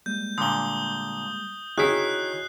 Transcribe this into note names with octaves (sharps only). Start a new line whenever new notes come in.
G3 G#3 A#3 G6
A#2 D3 D#6 G7
D#3 E4 F#4 G#4 C#5 D#5 F#6 C7